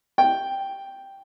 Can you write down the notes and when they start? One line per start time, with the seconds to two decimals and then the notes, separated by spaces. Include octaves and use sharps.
0.18 G5